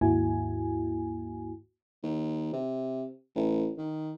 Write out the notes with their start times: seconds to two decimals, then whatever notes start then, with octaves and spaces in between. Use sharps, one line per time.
0.01 D#2 G#2 A#3 E4 F#4 G#5
2.03 D#2
2.53 C3
3.35 A1
3.78 D#3